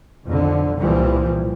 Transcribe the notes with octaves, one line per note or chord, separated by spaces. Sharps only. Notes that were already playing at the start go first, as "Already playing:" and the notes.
B1 F2 D3
C2 A#2 E3 F3 G3